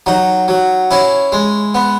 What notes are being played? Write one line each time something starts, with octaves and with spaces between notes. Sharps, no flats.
F#3 D#4
F#3
C#4 E4
G#3
B3